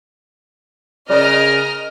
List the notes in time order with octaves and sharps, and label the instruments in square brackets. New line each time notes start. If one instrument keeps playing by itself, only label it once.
[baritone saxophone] C#3 [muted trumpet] A#4 [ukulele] D5 [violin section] D#5 F6